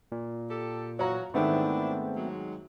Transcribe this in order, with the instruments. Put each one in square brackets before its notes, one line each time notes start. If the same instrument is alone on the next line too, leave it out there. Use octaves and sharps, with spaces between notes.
[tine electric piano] A#2
[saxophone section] G4 A4
[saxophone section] E3 F#3 F#4 [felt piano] C#5 F5 A#5
[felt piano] G#2 D#3 [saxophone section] E3 D4 E4 [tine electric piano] A3 B3 C4
[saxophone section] F#3 G#3